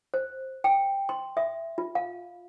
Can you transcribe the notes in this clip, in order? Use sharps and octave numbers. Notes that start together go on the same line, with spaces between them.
C5
G5
C6
E5
F4
F5